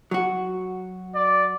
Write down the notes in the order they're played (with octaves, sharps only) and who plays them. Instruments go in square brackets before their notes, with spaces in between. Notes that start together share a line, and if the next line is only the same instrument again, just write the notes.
[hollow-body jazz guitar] F#3 F#4
[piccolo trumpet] D5